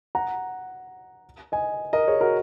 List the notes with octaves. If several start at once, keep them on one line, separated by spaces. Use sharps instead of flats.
F#5 A#5
D#5 G#5
A#4 D#5
G#4 C#5
F#4 A#4